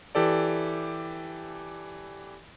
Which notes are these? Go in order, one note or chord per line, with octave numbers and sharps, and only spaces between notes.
E3 G4 A4 D5